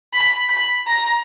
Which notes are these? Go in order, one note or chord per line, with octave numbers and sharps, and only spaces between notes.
B5
B5
A#5